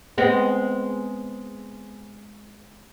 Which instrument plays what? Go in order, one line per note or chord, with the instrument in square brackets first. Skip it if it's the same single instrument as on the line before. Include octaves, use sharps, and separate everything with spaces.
[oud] G#3 B3 C4